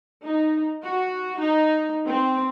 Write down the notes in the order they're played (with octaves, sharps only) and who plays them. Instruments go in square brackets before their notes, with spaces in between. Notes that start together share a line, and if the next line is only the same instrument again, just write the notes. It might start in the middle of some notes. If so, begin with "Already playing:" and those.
[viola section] D#4
F#4
D#4
C4